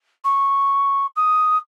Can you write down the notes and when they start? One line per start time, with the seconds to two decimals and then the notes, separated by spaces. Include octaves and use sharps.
0.24 C#6
1.16 D#6